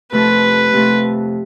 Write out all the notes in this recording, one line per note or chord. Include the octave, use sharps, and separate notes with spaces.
F2 C3 F3 A3 B4
F2 C3 F3 A3